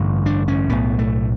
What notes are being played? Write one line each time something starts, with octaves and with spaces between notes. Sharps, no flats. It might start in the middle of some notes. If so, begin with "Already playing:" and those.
Already playing: A1 G2 D3
D4
C#4
B1 A2 B3
A3